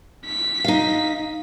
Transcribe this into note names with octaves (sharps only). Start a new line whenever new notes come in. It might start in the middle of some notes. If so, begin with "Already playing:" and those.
B6
D#4 F5